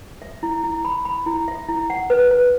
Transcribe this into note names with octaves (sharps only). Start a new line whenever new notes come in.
E5
E4
E4
B5
B5
E4
E5
E4
F#5
B4
B4